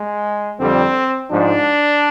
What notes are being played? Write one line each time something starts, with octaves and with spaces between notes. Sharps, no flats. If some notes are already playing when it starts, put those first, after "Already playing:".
Already playing: G#3
F2 D3 G3 C4
G#2 F3 D4